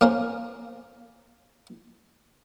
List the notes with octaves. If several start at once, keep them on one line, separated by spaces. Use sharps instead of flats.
A#3 C#4 A#4 C5